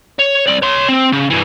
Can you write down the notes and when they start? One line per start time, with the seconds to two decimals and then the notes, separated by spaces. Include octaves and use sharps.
0.19 C#5
0.47 C2 D5
0.62 C#5 C6
0.88 C4
1.12 C#3
1.30 G2 E3